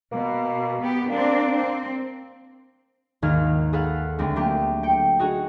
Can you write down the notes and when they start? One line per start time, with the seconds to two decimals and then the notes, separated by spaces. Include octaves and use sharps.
0.12 B2 A#3
0.82 B3 G4
1.10 A#3 C4 D4
1.55 C4
3.22 G#1 D#2 D#3 F5 F6 G#6
3.73 G#4 A4 B4 F5 F#5
4.19 D2 G#3 C4
4.36 F#3 A3 A#3 D4 G4
4.83 G5 C#7
5.19 D#4 F#4 G#4